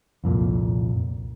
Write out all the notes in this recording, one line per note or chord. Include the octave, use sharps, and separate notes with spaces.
C2 F2 A#2